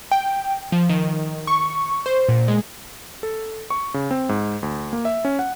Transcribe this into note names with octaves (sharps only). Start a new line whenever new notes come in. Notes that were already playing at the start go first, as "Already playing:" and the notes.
G5
F3
D#3
C#6
C5
A#2
G#3
A4
C#6
C#3
C4
G#2
D2
A#3
E5
C#4
F#5